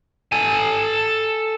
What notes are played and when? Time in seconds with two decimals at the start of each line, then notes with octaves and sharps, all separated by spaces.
0.32 A4 G#5